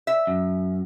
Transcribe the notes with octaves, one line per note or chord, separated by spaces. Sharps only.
E5
F#2